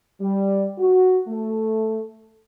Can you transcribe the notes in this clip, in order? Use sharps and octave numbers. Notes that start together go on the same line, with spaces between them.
G3
F#4
A3